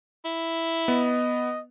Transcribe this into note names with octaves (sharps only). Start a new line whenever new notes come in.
E4
B3 D#5